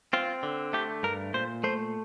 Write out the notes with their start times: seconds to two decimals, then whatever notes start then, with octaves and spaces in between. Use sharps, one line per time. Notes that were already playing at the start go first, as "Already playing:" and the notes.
0.13 C4 F4
0.43 D3
0.73 A3 G4
1.03 G2 A#4
1.34 A#2 C5
1.64 A3 C5